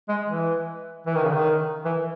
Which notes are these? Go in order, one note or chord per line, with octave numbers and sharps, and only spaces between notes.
G#3
E3
E3
D#3
C#3
D#3
E3